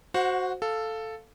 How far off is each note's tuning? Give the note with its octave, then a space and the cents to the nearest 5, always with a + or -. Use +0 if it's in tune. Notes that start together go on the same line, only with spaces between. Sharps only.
F#4 +0 C5 +0 F#5 -30
A4 +0 F5 +0